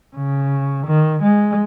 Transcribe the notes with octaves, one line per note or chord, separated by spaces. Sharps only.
C#3
D#3
G#3